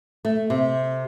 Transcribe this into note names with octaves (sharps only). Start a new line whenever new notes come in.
A3
C3